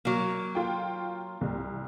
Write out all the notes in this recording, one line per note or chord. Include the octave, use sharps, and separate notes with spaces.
F#3 A#3
F4 G5
C2